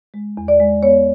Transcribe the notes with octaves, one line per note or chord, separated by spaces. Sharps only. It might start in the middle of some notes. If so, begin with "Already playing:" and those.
G#3
E2
D5
G#3
B3 C#5